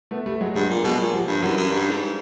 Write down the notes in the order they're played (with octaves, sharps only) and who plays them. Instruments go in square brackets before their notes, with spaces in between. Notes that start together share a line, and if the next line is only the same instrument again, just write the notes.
[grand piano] A3 B3
G3 A3
F#3 G#3
[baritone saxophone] G2 [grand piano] F#3 G#3
[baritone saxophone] A#2
[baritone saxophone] B2 [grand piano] F#3 G#3
[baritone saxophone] A#2
[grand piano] F3 G3
[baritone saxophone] G2
[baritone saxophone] F#2 [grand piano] E3 F#3
[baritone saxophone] F#2
G2
G#2